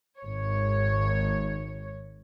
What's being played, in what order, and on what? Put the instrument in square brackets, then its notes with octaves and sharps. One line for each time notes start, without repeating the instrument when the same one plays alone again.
[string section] G#1 C#5